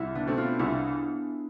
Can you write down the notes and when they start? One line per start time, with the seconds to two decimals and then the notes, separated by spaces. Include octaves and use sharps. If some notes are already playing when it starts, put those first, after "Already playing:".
Already playing: C2 E4
0.15 B3 D4
0.27 B2 A3 C4
0.37 D4 F4
0.59 C2 E4 G#4